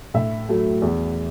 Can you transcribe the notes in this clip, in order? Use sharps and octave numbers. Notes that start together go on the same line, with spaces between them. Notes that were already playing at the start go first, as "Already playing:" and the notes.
A2 E5
F#3 A3
E2